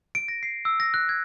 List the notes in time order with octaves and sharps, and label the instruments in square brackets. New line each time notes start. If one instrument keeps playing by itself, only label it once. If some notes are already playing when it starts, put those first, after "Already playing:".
[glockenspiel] D7
A#6
C7
E6
A#6
F#6
G#6